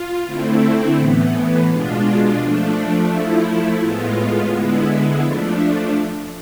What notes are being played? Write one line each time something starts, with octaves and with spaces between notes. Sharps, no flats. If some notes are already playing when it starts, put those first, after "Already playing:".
Already playing: F4
D3 A3 C4 E4
A2 E3 B3
B2 G#3 D4 F4
F3 A3 D4
F3 A3 E4
A2 G#3 B3 F4
D3 G#3 B3 E4
F3 A3 D4